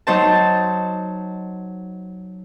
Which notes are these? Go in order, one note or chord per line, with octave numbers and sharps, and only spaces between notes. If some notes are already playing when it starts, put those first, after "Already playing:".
F#3 D#4 C5 A5